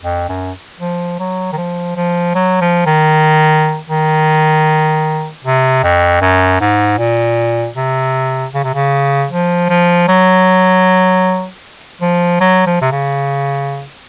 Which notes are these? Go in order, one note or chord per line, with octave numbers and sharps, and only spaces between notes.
F2
F#2
F3
F#3
D#3
F3
F3
F#3
F3
D#3
D#3
C3
F2
F#2
G#2
A#2
C3
C#3
C3
C#3
F3
F3
F#3
F3
F#3
F3
C3
C#3